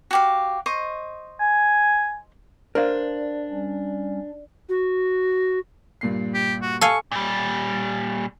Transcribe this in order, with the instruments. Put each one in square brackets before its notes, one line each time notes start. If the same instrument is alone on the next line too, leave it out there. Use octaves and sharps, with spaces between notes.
[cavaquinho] F#4 G4 F5
C5 D#5 C#6
[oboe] G#5
[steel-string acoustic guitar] D4 [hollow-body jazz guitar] A#4 C5 F5
[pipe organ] G3 C#4
[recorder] F#4
[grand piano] G2 A#2 C7
[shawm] G4
F#4
[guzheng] A4 F5 G#5 [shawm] C#6
[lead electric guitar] A#2 G3